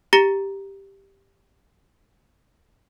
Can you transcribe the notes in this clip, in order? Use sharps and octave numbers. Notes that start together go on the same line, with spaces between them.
G4 A#5 A6 A#6 C#7 G7